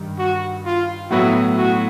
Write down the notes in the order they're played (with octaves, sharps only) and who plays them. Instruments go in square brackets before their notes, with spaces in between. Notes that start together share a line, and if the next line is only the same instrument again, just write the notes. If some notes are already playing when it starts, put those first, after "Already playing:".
Already playing: [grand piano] G2 D#3 G3
[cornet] F#4
F4
[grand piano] A2 F#3 B3 E4 [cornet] F#4
[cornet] F#4